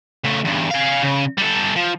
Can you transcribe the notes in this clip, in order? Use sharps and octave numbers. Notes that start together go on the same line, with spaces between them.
C#3 A3
E2 G2
G#4 F5
C#3
G3 A4
F3